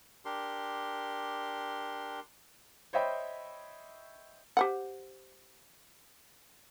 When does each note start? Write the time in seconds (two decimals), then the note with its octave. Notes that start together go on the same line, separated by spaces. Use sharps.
0.25 D4 G4 A#4 C6
2.93 C5 C#5 D#5 E5 G5 B5
4.57 G4 C5 F#5